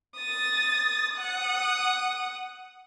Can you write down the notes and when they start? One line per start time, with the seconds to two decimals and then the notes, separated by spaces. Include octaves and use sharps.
0.16 D#6 A6
1.14 F#5 D#6